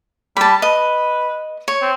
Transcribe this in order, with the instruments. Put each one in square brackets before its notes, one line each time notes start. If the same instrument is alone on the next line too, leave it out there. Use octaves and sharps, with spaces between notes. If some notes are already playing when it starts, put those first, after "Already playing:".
[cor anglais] G3 [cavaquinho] A5 B5
[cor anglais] B4 [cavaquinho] D#5
[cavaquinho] C#5
[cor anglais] C4